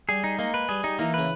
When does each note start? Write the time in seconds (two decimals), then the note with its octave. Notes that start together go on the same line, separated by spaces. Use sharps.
0.09 G3 G#4
0.24 D#4
0.39 G#3 A#3
0.54 B4
0.69 G3 G#4
0.84 G3 D#4
0.99 E3 A#3
1.14 C#3 B4